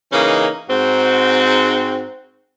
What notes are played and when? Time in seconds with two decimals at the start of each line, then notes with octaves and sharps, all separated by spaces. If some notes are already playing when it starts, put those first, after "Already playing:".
0.12 C#3 E3 A#3 C#4 D#4
0.69 G#2 C4 F#4